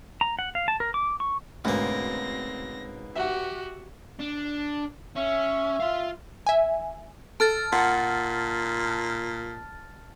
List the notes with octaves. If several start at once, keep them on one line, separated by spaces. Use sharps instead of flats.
A#5
F#5
F5
A5
A#4
D6
C#6
D2 G#2 B2 A#3 C4 C#4 A#6
F#4 G4 E5 F#5
D4
C#4 E5
F4 F5
E5 G#5
A4 A5 F6 A6
A#2 F#5